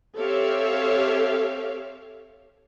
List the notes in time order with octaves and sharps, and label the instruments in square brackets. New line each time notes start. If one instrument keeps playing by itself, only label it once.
[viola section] C4 G4 A4 C#5 E5 F5